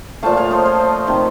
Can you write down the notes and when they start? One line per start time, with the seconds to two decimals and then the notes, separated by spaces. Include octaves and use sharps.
0.23 A#2 F3 A3 F5 A5
0.37 C#5 F5
0.51 C5 D#5
0.65 C5 D#5
1.07 C3 D#3 A3